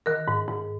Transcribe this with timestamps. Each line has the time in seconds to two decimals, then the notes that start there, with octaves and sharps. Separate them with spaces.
0.06 D#3 A#4
0.28 G#2
0.48 G#2